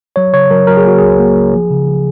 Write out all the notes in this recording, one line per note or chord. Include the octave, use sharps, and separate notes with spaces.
F#3 C#5
C#3 C#5
F#3 A#4
F#3 A#4
G#4
A#3 F#4
C#2 G#4
A#3
A#3
F3
C#3
F3